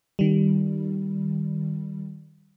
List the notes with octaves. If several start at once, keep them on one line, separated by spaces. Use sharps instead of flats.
D#3 G3